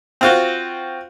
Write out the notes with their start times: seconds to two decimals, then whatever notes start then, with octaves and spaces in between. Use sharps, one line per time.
0.21 C4 F4 F#4